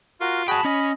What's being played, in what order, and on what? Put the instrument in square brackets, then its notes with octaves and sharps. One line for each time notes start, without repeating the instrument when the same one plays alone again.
[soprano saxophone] F4 [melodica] F#4 A#4
[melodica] F#4 G#4 [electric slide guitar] G5 A5 [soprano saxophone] B5
[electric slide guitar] C#4 [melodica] D#5